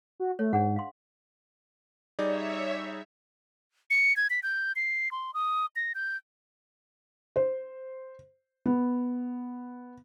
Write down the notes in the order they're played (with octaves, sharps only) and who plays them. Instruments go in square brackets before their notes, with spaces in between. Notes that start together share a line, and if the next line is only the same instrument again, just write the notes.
[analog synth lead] F#4
[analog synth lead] A3 [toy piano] C#5
[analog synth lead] G#2 [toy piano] D4 G#4 F#5
[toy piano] F5 C6
[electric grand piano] G3 D#4 G#4 [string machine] C#5 E5 [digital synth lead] D5
[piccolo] C#7
G#6
B6
G6
C7
C6
D#6
A#6
G6
[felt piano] C5
B3